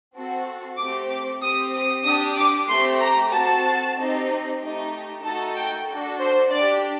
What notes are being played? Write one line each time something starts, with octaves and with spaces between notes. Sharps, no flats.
C4 F#4 A4
A3 C4 G4 D6
D6
C4 G4 D#6
D#6
D4 G4 D#6
D6
A3 C4 G4 C6
A#5
C4 F#4 A4 A5
C4 D#4 G4
A3 D#4 G4
A3 D#4 F#4 A4 A5
G5
D4 F#4 A4
C5
D4 G4 D5